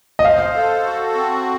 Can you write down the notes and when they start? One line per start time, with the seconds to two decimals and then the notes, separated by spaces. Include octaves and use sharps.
0.19 D#5
0.24 C5 F5
0.55 A4
0.85 F#4
1.15 C4